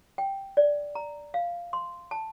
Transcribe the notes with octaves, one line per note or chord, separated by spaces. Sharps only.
G5
D5
A#5
F5
C6
A5